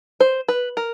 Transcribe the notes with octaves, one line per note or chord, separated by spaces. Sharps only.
C5
B4
A#4